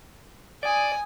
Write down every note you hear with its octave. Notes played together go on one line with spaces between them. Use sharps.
D5 G#5 D#6